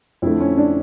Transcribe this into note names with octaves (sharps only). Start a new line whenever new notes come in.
F2 D3 A3 E4
C#4
D4